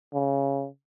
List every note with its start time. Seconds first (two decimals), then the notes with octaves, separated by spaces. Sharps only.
0.14 C#3